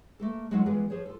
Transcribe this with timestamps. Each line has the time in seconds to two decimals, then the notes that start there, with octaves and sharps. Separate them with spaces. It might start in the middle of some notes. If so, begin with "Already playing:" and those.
0.20 A3 A#3 A4
0.51 F#3 G#3 A3 D#4 F4 F#5
0.66 E3 F3 G#3 B3 F4 G#4
0.90 F3 G#4 C5 C#5
1.06 F4 A4